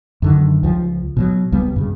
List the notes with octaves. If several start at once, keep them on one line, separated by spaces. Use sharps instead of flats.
F#2 D3 D#3
C#2 F3
B2 F3 F#3
C#2 G3 B3
G2 C#3